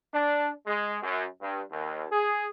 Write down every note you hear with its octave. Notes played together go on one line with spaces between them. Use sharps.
D4
G#3
F#2
G2
D#2
G#4